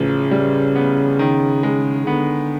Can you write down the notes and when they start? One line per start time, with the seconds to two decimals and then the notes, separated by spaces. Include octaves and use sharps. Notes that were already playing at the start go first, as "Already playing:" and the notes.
Already playing: A1 C#3 F3
0.31 G3
0.75 B3
1.19 D#3
1.63 G#3
2.07 D3 B3